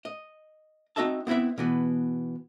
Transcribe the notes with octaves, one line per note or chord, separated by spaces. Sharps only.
D#5
C4 D#4 F#4 D#5 E5 A5
B3 C4 E4 B4 E5
B2 E3 B3